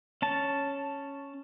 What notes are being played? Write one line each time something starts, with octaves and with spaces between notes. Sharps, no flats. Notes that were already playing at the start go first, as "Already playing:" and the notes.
C#4 A5